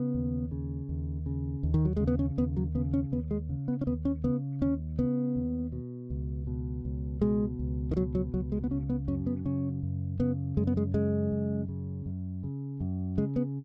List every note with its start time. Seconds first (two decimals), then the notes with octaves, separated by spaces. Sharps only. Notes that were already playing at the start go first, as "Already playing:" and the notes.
Already playing: C#3 B3
0.14 D#2
0.51 C#3
0.89 D#2
1.26 C#3
1.63 D#2
1.74 D#3
1.85 F#3
1.97 C#3 G#3
2.07 B3
2.19 C#4
2.38 D#2 B3
2.57 F#3
2.75 C#3 B3
2.94 C#4
3.12 D#2 B3
3.31 G#3
3.49 C#3
3.68 B3
3.81 C#4
3.87 D#2 B3
4.05 C#4
4.24 C#3 B3
4.61 D#2 C#4
4.99 C#3 B3
5.36 D#2
5.72 B2
6.10 C#2
6.47 B2
6.85 C#2
7.21 B2 G#3
7.59 C#2
7.91 D#3
7.96 B2 F#3
8.15 F#3
8.34 C#2 F#3
8.52 G#3
8.64 B3
8.71 C#3 C#4
8.90 B3
9.08 F#2 C#4
9.27 B3
9.45 C#3 C#4
9.83 F#2
10.19 C#3 B3
10.57 F#2 G#3
10.67 B3
10.77 G#3
10.94 C#3 G#3
11.32 F#2
11.69 C#3
12.06 F#2
12.44 C#3
12.81 F#2
13.18 C#3 G#3
13.36 B3